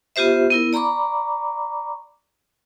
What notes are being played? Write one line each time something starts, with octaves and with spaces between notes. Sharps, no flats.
B3 F4 G4 C5 E5
B3 E4 A#4
D5 A#5 B5 C#6 D6